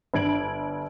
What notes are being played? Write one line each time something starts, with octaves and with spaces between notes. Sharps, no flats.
G1 D4 G#6 D7 F#7